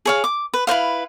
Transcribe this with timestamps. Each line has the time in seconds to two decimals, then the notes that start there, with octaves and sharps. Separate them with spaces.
0.05 G#4 C#5 F5
0.24 D6
0.54 B4
0.67 E4 B4 C5 F5